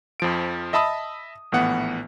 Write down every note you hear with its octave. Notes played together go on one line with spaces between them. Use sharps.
F2 F3 D7
D#5 E5 A5 B5 D#6
A#1 A2 E3 B3 F#5